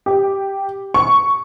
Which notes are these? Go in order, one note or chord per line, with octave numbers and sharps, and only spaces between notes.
G4
C#6